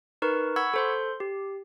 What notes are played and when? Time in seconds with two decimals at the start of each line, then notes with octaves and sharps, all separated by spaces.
0.22 D#4 A#4 B4 C#6
0.56 F#5 B5 C#6 E6 G#6
0.74 A4 C5 C6
1.20 G4